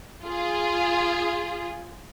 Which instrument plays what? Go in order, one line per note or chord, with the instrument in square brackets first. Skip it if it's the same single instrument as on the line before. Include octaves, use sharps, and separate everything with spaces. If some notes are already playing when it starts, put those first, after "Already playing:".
[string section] F4 G#4